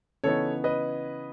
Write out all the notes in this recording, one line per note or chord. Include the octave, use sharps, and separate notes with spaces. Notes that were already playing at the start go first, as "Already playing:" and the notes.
C#3 E3 B3 D#4 A4 C#5
B4 D#5